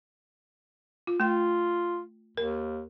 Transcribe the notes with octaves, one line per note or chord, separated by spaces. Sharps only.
F4
A3 F4 G5
D#2 A#4